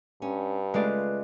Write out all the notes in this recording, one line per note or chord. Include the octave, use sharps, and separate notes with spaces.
G2 C#4
C#3 G#3 A3 F4 B4 D5